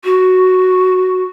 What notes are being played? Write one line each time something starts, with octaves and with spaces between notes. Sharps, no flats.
F#4